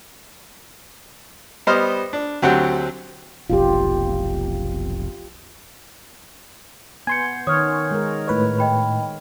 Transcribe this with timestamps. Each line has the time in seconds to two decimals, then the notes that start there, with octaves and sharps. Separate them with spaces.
1.67 G3 B3 C5 D#5 F6
2.13 D4
2.42 D2 F#3 C4 G4 F#5
3.50 F1 B1 F2 F4 G4
7.07 B3 G#5 C6 G6 G#6 C#7
7.47 D#3 C#5 D#6 F6
7.91 G#3 A#4
8.28 A2 B4 C#5
8.59 D#5 G5 B5